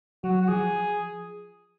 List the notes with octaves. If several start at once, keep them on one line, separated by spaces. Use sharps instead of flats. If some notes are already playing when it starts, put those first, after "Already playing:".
F#3 F#4
F#4
F3 G#4